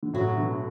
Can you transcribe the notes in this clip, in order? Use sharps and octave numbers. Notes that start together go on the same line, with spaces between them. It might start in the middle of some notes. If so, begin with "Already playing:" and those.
D3
A2 C#3 F#3
B2 D3